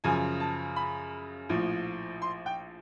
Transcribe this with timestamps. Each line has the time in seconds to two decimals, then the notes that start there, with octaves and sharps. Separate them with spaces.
0.04 F#2 C#3 F3 G#5
0.40 A5
0.76 B5
1.49 A#1 A2 F3
2.22 C6
2.46 G5